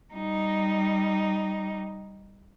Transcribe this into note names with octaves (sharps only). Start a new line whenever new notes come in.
G3 D#4